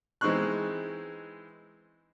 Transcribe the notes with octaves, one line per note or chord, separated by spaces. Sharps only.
E3 G#3 C4 D#4 C#6 F#6